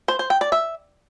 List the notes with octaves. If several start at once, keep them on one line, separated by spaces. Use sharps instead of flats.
C5
C5
G5
D5
E5